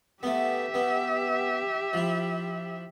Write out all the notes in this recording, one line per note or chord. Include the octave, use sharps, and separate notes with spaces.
A3 B3 G4 E5
B3
F3 E4